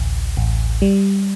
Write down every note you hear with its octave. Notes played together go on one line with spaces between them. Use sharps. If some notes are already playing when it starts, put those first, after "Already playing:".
Already playing: A1 D2
A1
G3